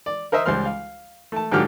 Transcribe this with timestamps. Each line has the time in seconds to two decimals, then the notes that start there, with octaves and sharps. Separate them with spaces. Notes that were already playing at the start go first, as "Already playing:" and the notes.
0.06 D5
0.32 A#4 C5 D#5 E5
0.46 C#2 G3 C5 C6 F6
0.65 F5
1.32 A3 A5
1.52 G#2 D3 F3 F#3 G4 F6